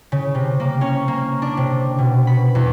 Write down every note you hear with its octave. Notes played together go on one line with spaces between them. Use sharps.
C#3
C3
A#3
C#4
A#3
D4
C3
B2
B5
E2